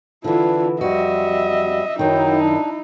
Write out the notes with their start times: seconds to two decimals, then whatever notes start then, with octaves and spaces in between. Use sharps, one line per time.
0.24 D3 E3 D4 E4 F4
0.81 F2 G3 F#4 D#5 E5
1.99 F#2 D#3 F#3 D#4 E4 G5
2.40 D4